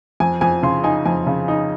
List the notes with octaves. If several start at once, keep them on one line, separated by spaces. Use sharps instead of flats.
F2 G#5
F2 G#5
C#3 C6
D#4 G#5
F2 G#5
C#3
D#4